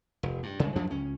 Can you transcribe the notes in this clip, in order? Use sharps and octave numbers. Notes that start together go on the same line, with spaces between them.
F1
G2
C#3 E3 G#3
F#2 F3 F#3 D4
C#2 C#4